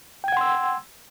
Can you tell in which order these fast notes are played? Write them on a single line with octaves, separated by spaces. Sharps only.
G5 G#6 F#5 C6 E6